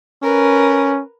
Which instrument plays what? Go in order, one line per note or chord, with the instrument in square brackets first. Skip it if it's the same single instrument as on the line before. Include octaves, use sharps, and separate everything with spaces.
[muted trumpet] C#4 [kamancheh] A#4 B4